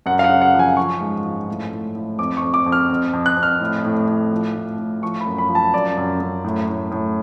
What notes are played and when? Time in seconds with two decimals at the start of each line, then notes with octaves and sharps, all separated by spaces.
0.06 F#2 F#5
0.19 F5
0.24 F#5
0.29 C#3
0.41 F#5
0.54 F3
0.59 G#5
0.77 F3 C#6
1.00 G#2
1.25 F3
1.49 A2
1.71 A2
1.95 A2
2.19 F2 D6
2.37 C#6
2.42 F2
2.54 D6
2.66 F2
2.72 F6
2.90 F2
3.13 F2
3.26 F#6
3.37 F2
3.43 F6
3.60 A2
3.85 A2
4.08 A2
4.32 F3
4.55 A2
4.79 A2
5.02 F3 C#6
5.20 B5
5.27 F#2
5.38 B5
5.49 F3
5.55 A5
5.74 F#2 D5
5.97 F#2
6.20 F#2
6.44 A2
6.68 A2
6.91 A2